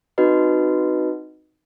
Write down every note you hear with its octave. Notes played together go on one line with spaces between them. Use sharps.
C4 D#4 F#4 B4 D#5